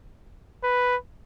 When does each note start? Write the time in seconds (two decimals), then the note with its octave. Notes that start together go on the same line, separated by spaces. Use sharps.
0.64 B4